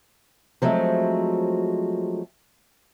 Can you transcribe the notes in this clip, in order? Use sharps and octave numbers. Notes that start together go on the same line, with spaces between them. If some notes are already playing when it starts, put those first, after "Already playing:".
F3 F#3 G#3 A3 C4